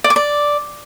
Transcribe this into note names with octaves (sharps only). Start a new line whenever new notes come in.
D5
D6
D5